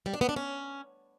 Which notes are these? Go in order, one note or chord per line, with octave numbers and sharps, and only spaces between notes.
G3
D4
B3
D4
C#4